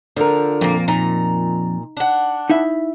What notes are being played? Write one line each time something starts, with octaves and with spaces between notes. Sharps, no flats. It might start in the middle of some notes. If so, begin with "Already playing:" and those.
D3 F3 A#4
F2 A#2 A#3
A#2 D#4 A#5
D4 F#5
D#4 E4 E5